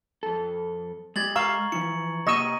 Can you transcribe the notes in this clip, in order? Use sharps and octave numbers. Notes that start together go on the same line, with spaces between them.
F2 A4
G#3 G4 D#5 G#6 A6 F#7
F5 A#5 C#6 E6
E3 F3 E4 C#7
C3 A#3 G4 D#5 C#6 E6 A#6 D#7